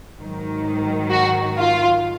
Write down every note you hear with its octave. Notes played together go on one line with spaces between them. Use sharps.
G#2 D#3 F#3
F#4
F4